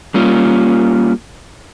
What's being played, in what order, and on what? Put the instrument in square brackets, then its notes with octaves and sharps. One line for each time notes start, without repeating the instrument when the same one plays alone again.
[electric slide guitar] G3 A#3 C#4 F4